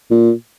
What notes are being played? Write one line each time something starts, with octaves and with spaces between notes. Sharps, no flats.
A#2